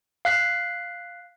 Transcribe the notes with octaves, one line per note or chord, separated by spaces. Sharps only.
F5 F#6 B6